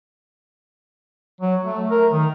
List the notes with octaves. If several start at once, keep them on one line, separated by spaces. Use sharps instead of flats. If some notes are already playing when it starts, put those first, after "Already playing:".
F#3
A3
A#4
D#3